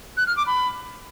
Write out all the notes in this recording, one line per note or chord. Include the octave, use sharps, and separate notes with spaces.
F#6
F6
D6
B5